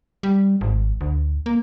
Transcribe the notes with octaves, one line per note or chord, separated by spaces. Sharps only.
G3
G#1
D2
A#3